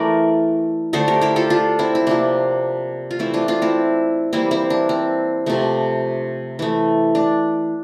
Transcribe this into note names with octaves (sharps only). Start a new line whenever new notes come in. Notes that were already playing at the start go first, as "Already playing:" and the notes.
Already playing: E3 A3 A#4 D5
D3 A3 A4 C5
G4 A#4
E4 G4
F4 A4
D4 F4
C4 E4
E4
C3 F3 A#3 D4
F4
E3 A3 C4 E4
D4 F4
D4 F4
C4 E4
E3 G3 A#3 C4 E4
C4 E4
D4
C4
C3 F3 A3
E3 A3
D4